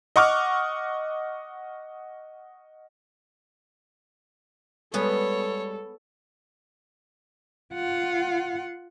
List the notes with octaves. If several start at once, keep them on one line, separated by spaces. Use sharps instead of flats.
D#5 F#5 C#6 D6 F6
G3 G#3 B3 G#4 A4 C#5
F4 F#5